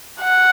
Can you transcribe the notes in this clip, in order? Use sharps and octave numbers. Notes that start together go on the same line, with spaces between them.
F#5